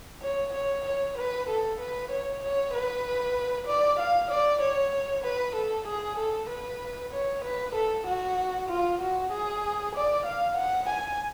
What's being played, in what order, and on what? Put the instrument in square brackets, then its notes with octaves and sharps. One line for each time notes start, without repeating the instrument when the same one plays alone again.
[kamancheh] C#5
C#5
C#5
B4
A4
B4
C#5
C#5
B4
D5
F5
D5
C#5
B4
A4
G#4
A4
B4
C#5
B4
A4
F#4
F4
F#4
G#4
D5
F5
F#5
G#5